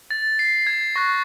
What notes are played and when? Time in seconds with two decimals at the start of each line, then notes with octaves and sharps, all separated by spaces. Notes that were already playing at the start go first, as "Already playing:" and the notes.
0.11 A6
0.39 C7
0.67 G#6
0.96 C#6 F#6 A#6